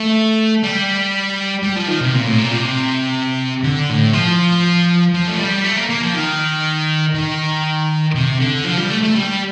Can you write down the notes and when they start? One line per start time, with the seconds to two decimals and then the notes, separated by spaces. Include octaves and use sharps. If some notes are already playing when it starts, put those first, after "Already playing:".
Already playing: A3
0.64 G3
1.63 G3
1.76 F3
1.88 D#3
2.01 C3
2.14 A#2
2.26 A2
2.38 A#2
2.51 C3
3.63 D3
3.89 A2
4.13 F3
5.14 F3
5.28 A3
5.39 G3
5.64 A3
5.77 A#3
5.90 A#3
6.02 F3
6.15 D#3
7.15 D#3
8.15 C3
8.40 D3
8.65 F3
8.77 G3
8.90 A3
9.03 A3
9.15 G3